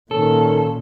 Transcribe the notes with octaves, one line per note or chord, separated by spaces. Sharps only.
A#2 D#3 C#4 A4